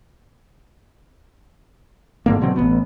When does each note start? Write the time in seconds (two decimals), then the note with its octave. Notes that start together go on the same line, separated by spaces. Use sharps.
2.26 G#2 D3 A#3
2.41 B2 D3 F#3 C4
2.56 A1 B3